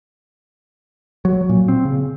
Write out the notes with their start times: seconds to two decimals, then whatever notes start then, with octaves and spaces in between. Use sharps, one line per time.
1.25 F#3
1.49 A#2
1.68 C4
1.85 C#3